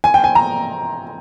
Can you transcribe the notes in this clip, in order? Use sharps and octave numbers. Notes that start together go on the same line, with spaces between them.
G#5
G5
G#5
A#5